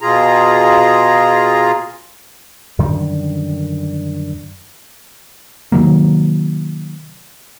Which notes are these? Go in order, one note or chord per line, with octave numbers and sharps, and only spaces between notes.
B2 F4 G#4 A#5
F#2 D3 D#3 G3
C3 D#3 F#3 A#3